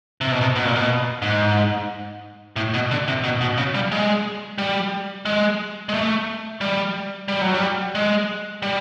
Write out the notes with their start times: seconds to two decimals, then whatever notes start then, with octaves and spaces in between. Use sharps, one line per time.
0.21 C3
0.32 B2
0.41 C3
0.56 B2
0.65 A#2
0.75 B2
1.22 G#2
2.56 A2
2.74 B2
2.91 D3
3.08 C3
3.24 B2
3.41 B2
3.58 C#3
3.74 G3
3.92 G#3
4.58 G3
5.25 G#3
5.89 G#3
5.94 A3
6.61 G3
7.28 G3
7.41 F#3
7.54 G3
7.95 G#3
8.62 G3